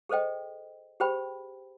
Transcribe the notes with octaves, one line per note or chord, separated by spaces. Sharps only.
G#4 A4 C5 D#5 G5
G4 G#4 C5 G5 B5